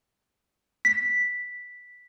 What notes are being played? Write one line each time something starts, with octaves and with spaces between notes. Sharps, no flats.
B6